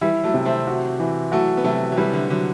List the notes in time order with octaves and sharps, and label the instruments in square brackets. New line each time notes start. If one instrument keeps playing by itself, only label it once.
[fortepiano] E3 G3 [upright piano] E4
[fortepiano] F#3 A3
[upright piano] C3
[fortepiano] A3 C4
[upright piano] F#4
E3
[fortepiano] F#3 A3 [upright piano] F#4
[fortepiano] B3
[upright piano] C3 [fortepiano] F#3 A3
[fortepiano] F#3
[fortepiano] E3 G3 [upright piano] B4
[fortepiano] D3
[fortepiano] D3 [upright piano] F#3